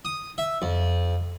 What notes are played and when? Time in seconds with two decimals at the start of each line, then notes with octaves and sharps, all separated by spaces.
0.05 D#6
0.38 E5
0.62 F2